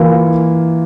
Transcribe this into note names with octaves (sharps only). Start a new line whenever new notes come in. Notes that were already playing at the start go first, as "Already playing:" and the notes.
Already playing: E3 A#3 F4